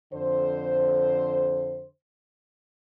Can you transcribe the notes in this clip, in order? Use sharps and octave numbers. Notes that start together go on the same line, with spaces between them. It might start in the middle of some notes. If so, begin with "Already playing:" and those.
F2 D3 C5